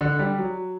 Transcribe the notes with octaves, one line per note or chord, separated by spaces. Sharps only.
D3
G3
F#3